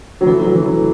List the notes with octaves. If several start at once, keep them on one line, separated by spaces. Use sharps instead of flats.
F#3
E3 A3 E4 A4
F#3
E3